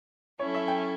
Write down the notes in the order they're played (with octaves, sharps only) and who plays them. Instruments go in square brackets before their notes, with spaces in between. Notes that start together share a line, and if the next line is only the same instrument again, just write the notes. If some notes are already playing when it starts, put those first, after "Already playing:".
[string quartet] F#3 C#4 E4 A4 [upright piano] C#5
[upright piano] E5
G5